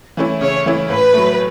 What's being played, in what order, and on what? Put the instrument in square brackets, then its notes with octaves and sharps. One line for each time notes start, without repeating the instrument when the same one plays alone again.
[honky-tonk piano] E3 A3 C#4 E4
[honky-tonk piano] C#3 [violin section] C#5
[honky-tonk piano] E3 A3 C#4 E4
[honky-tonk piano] A2 [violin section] B4
[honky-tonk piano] F#3 A3